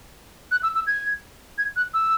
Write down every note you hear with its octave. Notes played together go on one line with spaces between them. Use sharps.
F#6
E6
E6
G#6
G#6
F#6
E6